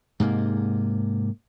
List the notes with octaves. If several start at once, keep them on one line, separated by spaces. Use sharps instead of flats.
G#2 C3 A#3